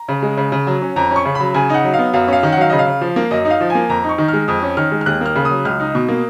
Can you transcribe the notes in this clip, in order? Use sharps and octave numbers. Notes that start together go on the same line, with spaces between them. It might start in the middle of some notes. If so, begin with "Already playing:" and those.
Already playing: A#5
C#3
G#3
C#3
C#3
F#3
C#4
F2 A#5
C#4 C#6
C#3
F#3 B5
C#3 G#5
D#4 F#5
F#3
F5
B3
F#2 F5
C#4 F5
D#3
F#5
F#3 F5
C#3 D#5
F5
C#3
F3
A#3
F#2 D#5
D#4
F5
F3
G#5
A#3
F2 A#5
D#4
C#6
D#3
G#3 F6
F2 D#6
C#4
D#3 F6
G#3
F6
D#2 F#6
A#3 F6
C#3
D#6
F#3
C#2 F6
D#4
B2
A#3